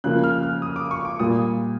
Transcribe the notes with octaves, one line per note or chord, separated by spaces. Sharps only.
C#3 F3 A#3 F#6
F6
F6
D#6
D6
C#6
D6
A#2 G3 A#3 D#6